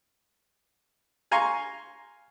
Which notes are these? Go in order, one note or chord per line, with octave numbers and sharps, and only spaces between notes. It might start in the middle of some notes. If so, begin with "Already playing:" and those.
F5 G#5 A#5 C6 C#6